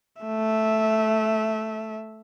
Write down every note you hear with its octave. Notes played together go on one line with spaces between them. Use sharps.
A3 E5